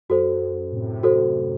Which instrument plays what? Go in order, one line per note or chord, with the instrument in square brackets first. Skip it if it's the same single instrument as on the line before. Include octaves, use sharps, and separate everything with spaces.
[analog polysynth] F#2 [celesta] F#4 A4 C5
[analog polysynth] A2 C3
[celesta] F#4 A4 C5